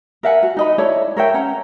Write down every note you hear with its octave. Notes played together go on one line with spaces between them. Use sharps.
A#4 E5 F#5 G#5
F#4
D#4 D#5 B5
E4 A4 C#5 D5
A#4 C#5 E5 G5
C#4 F#5 A#5